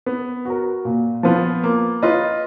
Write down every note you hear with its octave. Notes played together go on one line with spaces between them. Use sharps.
B3
F#4 A#4
A#2
F3 B3 F4
A#3
F4 B4 D#5